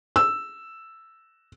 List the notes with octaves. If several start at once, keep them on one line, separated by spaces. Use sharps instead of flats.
E6